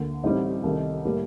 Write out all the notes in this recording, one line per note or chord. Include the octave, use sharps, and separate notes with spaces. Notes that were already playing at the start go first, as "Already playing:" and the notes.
Already playing: D2 D3 A#3
A1 A2 G3 C4 D#4
C2 C3 D#3 A3
A2 G3 A#3